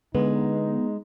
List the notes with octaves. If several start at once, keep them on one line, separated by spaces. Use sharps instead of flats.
D3 G#3 B3 D#4